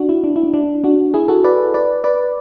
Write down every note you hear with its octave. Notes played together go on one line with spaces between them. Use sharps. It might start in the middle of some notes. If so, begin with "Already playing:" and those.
Already playing: D4 F#4
E4
D4
E4
D4
D4
D4 F#4
E4 G#4
F#4 A4
B4 D5
B4 D5
B4 D5